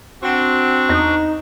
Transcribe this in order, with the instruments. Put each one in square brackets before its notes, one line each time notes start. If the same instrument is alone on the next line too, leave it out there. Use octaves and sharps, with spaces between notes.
[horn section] C4 F#4 [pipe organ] D4 C#6
[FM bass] E2 [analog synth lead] D#4